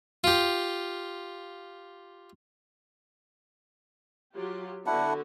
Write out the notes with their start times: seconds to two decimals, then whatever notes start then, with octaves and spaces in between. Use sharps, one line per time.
0.24 F4 G4
4.34 F#3 F4 G4
4.86 D3 B3 D4 E4 F#4 F#5